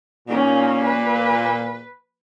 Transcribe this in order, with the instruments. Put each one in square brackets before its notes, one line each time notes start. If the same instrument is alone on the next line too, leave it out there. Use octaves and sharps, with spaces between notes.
[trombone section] A#2 [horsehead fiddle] C#4 D#4
[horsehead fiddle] B4